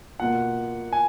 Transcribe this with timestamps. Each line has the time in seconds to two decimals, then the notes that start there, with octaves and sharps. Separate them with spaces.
0.20 B2 A#3 F4 F#5
0.93 G#5